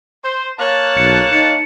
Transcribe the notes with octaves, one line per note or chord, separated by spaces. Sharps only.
C5
A#3 C#5 A5 F#6
B1 C#7
D#4 C#7